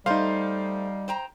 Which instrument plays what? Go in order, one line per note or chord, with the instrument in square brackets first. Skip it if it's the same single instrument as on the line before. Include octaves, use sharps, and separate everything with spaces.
[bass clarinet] G3 [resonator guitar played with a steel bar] A3 C5 [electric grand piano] D#4 F5
[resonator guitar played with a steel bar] C5 G5 A#5